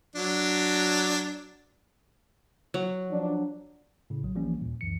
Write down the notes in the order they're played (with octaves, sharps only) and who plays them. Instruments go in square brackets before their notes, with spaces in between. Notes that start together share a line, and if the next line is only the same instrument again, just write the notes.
[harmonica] F#3 D4
[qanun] F#3
[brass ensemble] F3 D4
[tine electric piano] A2 C#3
A#1 F#3
E3 F3 G3 A#3 C#4
D#2 A#2
C#2 F#2 E3 C#7